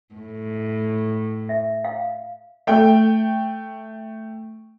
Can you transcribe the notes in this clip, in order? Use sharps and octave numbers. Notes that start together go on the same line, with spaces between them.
A2
E5
F5
A3 G5